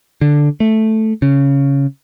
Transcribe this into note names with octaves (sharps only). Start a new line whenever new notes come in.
D3
A3
C#3